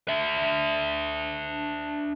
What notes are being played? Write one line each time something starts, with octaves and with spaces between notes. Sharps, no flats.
D4 E5